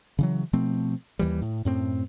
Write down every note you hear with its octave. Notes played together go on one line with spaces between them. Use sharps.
C#3 E3 F#3
B2 F3 A3 C4
D#2 E3 G3
A2
F#2 A2 C4